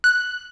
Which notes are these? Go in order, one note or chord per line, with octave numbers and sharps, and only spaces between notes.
F#6